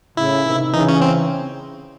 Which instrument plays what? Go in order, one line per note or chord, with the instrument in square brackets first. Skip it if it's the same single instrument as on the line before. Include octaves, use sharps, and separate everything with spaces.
[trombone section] A2 C#3 [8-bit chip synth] E4
[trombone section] C3 D#3
[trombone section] C#3 E3 [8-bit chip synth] D#4
[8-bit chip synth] C#4
C4